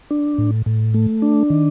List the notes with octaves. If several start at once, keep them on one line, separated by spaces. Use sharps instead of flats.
D4
A2
A2
A3
D4
D#3